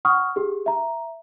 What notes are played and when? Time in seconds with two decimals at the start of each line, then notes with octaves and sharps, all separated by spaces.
0.05 F#5 C#6 D#6 F6
0.36 G4 G#4
0.66 E5 A#5